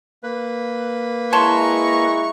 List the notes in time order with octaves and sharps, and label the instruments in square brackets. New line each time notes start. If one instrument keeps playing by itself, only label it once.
[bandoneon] A#3 B4
[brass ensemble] G#3 E4 A#5 [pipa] C#5 A5 C6 [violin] C#6